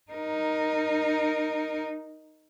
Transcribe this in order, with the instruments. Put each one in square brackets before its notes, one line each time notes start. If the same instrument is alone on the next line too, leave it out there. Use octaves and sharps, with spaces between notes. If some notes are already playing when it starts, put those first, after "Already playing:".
[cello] D#4 A#4